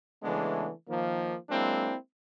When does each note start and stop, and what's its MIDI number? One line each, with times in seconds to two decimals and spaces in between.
0.23 0.69 49
0.23 0.69 52
0.23 0.69 56
0.23 0.69 57
0.23 0.69 59
0.23 0.69 62
0.88 1.35 51
0.88 1.35 53
0.88 1.35 58
1.50 1.94 54
1.50 1.94 56
1.50 1.94 58
1.50 1.94 60
1.50 1.94 62
1.50 1.94 64